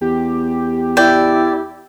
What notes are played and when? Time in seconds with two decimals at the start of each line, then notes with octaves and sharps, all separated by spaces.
0.01 E2 G4
0.97 E4 D5 G5